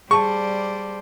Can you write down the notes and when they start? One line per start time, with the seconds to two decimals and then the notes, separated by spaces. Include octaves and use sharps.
0.11 G3 G#4 C5 D5 A5 C#6